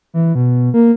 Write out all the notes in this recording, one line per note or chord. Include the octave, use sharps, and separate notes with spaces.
E3
B2
A#3